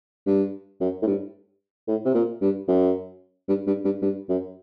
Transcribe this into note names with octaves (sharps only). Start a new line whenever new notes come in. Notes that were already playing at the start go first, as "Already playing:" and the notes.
G2
F#2
A2
G2
A2
C3
A#2
G2
F#2
G2
G2
G2
G2
F#2